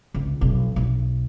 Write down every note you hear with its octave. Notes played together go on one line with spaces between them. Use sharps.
C#2
B1 F2
B1